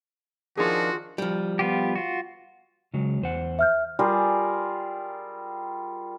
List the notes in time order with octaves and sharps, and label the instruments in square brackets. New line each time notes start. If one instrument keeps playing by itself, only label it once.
[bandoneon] D#3 F3 D4 [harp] F4 G#4 [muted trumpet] F#4
[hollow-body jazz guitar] F3 G3
[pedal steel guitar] B3 F4 G4
F4 F#4
[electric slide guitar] C#3 F#3 G#3
E2 C5 F#5
[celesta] E5 F6 G6
[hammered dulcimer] G3 F4 G#4 A#4